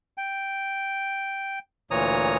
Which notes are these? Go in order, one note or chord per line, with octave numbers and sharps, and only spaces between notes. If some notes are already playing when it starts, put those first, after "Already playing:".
G5
D2 A#2 E3 C#5 A#5 D#6